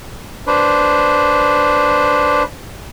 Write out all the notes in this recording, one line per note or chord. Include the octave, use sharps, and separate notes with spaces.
D4 B4 C5